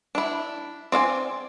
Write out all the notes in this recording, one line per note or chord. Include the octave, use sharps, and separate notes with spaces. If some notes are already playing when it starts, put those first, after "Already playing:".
D4 E4
C4 D5 F5 G#5